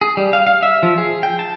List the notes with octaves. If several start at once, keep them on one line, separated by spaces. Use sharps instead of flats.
G#4
G3
F5
F5
E5
F3
G#4
G5
A5